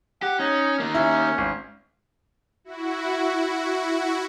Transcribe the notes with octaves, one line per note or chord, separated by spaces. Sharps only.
G4 F#5
C#4 D#4
D#3 A#3
C#4 E4
G#1
E4 F#4